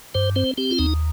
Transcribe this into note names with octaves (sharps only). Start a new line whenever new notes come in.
G2 C5
C4 C5
C4 G4
F4
D#2 D#4